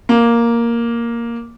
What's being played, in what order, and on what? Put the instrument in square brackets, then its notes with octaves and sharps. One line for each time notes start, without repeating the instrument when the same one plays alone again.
[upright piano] A#3